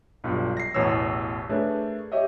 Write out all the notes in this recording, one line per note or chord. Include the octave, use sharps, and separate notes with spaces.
B1 G2 F4
A#6 C7
A1 E2 B2 C#5 E6
A3 D4 G#4 A#4 B4 C#5
G4 C#5 D#5 E5